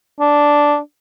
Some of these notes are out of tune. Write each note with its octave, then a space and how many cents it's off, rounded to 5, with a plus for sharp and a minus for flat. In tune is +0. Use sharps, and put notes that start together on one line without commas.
D4 -5